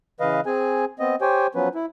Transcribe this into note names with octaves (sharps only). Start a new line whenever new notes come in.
C#3 E3 B4 D#5 F5
C4 G#4 G#5
B3 C4 D#5
G4 C5 C#5 G5 G#5
F3 F#3 B3 C#4 B4
E4